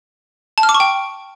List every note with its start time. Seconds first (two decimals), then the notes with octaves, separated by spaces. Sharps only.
0.58 A5
0.63 F6
0.69 D6
0.74 C#6
0.80 G5